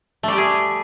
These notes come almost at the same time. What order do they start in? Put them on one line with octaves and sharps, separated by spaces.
A3 G3 G4 G#4